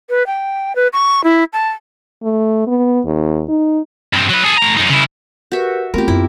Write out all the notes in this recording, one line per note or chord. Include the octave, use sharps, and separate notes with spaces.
B4
G5
B4
C#6
E4
A5
A3
B3
D#2
D#4
G2 C4
F#3 B4
G#4 A4
A2 A#5
F#2 D#4
C#3 E4
F#4 G4 A#4 B4 E5
A3 B3 C4 F4 G4 A#4
F#2 E4